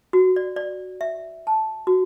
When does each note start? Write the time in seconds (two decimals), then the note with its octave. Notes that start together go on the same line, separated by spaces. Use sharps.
0.13 F#4
0.36 D5
0.56 D5
1.01 E5
1.47 A5
1.87 F#4